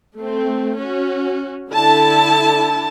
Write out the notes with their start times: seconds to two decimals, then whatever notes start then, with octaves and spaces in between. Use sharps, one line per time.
0.18 A3 C4
0.78 C#4 F#4
1.70 D3 E4 A5